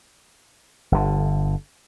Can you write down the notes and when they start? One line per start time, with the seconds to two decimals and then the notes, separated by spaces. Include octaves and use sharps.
0.92 G1 D3